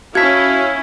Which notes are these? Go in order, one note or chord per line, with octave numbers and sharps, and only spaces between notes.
C#4 E4 F#4 F5 A5 G#6 B6